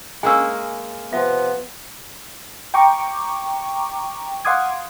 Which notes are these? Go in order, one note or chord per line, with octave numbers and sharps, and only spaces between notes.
G#3 A#3 C#4 G#5 E6
C3 F3 B3 E5
G5 A#5 C#6 D6
F5 F#5 C6 D6 D#6 G#6